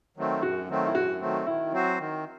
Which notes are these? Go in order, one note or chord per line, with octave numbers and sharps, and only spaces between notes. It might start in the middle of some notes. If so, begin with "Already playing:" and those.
D#3 F#3 A3 C4
F#2 F#4
D#3 F#3 A3 C4
E4
F#2 F#4
D#3 F#3 A3 C4
D#3 E4
F#3 C4 F#4 C5
D#3